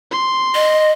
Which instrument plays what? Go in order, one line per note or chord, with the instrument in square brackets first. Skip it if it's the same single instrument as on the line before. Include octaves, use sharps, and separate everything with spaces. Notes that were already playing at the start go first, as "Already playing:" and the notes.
[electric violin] C6
[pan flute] D#5